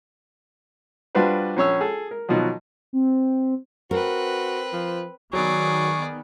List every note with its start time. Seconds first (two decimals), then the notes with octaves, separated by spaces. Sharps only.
1.15 G3 D4 F4 F#4 B4 C5
1.57 A#1 C#4 C#5 E6
1.81 G#4 A4
2.11 A#4
2.29 B2 D#3 F3 F#3
2.93 C4
3.91 C4 F#4 A#4 B4
4.73 F3
5.33 D#3 F#3 B3 G#4 D5 C#6